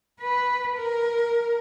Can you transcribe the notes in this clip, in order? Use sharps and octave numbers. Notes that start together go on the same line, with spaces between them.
B4
A#4